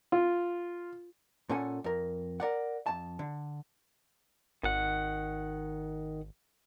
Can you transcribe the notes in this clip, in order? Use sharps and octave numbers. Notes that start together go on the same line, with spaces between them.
F4
A#2 C#4 A4 F#5 G#5
F2 A#4
A#4 D5 F#5
F2 A5
D3
G#1 D#3 F#5